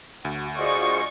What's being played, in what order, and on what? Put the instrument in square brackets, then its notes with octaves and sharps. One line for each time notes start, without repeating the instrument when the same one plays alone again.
[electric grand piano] D2 [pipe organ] F#4
[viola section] F4 D5 D#5 [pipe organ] F#4 G#4 C5 [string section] C#6